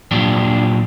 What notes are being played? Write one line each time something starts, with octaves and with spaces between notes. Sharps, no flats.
A#2 F3 F#3 D4 G4